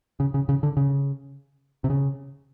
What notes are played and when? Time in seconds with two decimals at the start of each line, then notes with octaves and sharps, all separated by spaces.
0.20 C#3
0.34 C#3
0.49 C#3
0.63 D3
0.77 C#3
1.84 C3
1.90 C#3